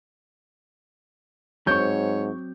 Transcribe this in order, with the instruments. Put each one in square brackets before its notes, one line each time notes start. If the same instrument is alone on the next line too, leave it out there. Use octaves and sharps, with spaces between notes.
[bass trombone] G#2 [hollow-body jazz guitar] F#3 C4 [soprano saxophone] C#5 [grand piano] C#6 G6